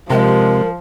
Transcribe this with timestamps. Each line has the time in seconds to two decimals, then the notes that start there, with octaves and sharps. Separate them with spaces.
0.10 C3 F3 G#3 A#4